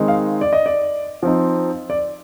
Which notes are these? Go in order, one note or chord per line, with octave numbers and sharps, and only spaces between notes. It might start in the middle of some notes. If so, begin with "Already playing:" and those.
Already playing: D#3 G#3 C4 D#4
F5
D5
D#5
D5
F3 C4 D#4
D5